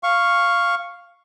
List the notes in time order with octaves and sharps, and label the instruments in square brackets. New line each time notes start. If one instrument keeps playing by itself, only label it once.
[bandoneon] F5 C#6